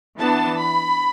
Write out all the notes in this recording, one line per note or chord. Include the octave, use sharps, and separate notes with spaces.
E3 B3 D4 A5
B5